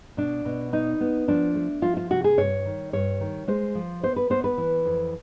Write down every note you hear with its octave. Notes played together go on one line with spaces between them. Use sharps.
B2 D4
B2
B3 D#4
B3
F3 D4
A3
F3 F4
F4
C3 F#4
G#4
G2 C#5
D#3
G2 C#5
D#3
G#3 C5
F3
B3 C5
B4
B3 C5
B4
E3
F2